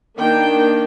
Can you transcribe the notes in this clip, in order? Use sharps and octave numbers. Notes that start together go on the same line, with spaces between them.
D#3 A#3 D4 G5